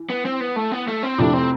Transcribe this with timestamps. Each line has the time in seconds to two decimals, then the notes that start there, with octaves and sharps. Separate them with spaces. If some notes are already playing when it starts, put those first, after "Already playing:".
Already playing: E3
0.10 B3
0.25 C4
0.41 B3
0.56 A3
0.72 B3
0.87 A3
1.03 C4
1.18 F2 C3 F3 A3 D4 E4
1.33 C4